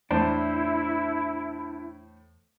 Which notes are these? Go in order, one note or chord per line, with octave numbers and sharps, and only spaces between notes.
E2 A2 D4 E4 C5 A5